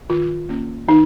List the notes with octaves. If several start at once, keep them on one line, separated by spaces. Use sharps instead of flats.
D#3 F4
A#3 C#4
D#3 D#4